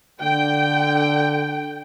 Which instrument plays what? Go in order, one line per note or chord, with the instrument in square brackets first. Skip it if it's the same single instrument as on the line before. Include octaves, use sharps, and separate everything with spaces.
[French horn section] D3 [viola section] G5